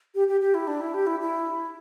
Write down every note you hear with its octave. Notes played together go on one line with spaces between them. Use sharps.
G4
G4
G4
E4
D4
E4
G4
E4
E4